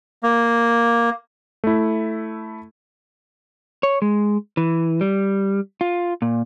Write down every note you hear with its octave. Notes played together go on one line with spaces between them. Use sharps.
A#3
A3 E4
C#5
G#3
E3
G3
F4
A#2